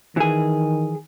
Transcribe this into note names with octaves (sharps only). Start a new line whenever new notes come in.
D#3 E3 G#4